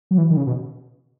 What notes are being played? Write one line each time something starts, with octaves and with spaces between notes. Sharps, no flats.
F#3
E3
D#3
C#3
B2